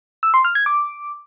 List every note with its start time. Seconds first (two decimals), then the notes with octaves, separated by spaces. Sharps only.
0.23 E6
0.34 C6
0.45 F6
0.55 G#6
0.66 D6